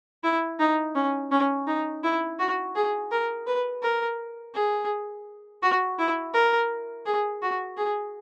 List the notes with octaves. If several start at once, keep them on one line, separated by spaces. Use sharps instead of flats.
E4
D#4
C#4
C#4
D#4
E4
F#4
G#4
A#4
B4
A#4
G#4
F#4
E4
A#4
G#4
F#4
G#4